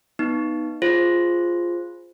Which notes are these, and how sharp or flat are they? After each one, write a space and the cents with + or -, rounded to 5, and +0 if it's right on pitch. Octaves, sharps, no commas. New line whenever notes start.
B3 +0 D#4 +0
F4 +0 G#4 +0 C5 +0